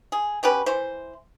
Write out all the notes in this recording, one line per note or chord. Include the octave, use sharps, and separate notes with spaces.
G#4
B2 C#4 G4 B4
E3 C5